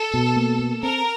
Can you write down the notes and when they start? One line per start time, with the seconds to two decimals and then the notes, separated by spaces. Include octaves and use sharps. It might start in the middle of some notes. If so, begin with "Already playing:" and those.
Already playing: A4
0.14 B2
0.36 A#3
0.59 A#3
0.82 C4 A#4